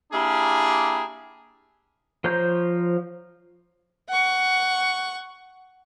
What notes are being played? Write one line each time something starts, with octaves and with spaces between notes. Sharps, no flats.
A#3 D4 E4 G4 G#4
F3 C5 C#5 A#5 G6
F#5 C#6